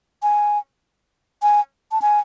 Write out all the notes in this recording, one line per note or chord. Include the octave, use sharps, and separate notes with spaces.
G#5
G#5
A5
G#5